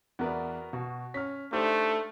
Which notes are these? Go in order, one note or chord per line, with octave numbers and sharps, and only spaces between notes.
E2 B3 F#4 A#4 B4 D5
B2 F#4
C#4 F6 B6
A3 D4 D#4 G4 C5